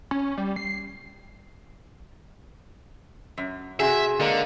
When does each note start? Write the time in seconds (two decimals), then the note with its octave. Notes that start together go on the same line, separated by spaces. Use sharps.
0.11 C#4
0.38 G3
0.56 C7
3.38 F#2
3.80 C3 F#4 G#4 E5
4.20 D3 G#3 A#3